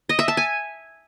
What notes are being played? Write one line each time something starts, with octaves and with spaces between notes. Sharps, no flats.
D#5
E5
A5
G#5